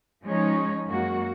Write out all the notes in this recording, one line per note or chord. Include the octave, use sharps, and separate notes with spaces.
F3 G#3 C#4 D#4 C#5
F#2 G#3 A#3 F#4